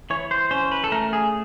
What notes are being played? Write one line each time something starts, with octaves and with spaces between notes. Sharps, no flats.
E3 C#5
C5
C#4 C5
B4
A4
A3 A#4
G#4